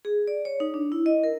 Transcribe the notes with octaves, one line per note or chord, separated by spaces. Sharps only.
G#4
D5
C#5
D#4
D4
E4
D#5
A#4